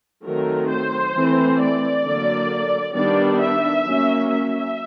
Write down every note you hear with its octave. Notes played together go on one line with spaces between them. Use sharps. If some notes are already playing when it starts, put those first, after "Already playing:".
D#3 F#3 A3 C4 A#4
C5
E3 A3 C4
D5
D3 F#3 A#3
D#3 G3 B3 D4 D5
E5
F#3 A#3 C#4
E5